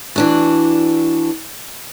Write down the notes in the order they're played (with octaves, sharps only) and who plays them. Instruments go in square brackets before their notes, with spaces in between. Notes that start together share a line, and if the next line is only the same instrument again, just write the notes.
[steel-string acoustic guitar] E3 D4 F#4